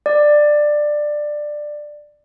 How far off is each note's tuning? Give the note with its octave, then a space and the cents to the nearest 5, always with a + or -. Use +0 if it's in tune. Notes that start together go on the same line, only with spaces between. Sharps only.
D5 +15